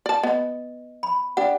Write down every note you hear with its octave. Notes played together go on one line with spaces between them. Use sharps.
D5 A5
B3 D#5
B5
D4 G4 F#5